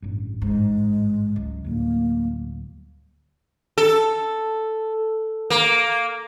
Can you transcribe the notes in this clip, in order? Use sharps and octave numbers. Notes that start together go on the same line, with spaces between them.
A1 G2
G#2 G#3
C#2 F#3
D2 A2 G3 A#3
A4
A#3